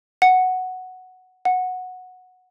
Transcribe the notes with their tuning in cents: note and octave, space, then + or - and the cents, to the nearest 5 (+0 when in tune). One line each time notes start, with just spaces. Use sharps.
F#5 +0
F#5 -10